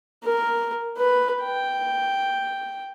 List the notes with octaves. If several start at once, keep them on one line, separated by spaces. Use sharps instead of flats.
A#4
B4
G5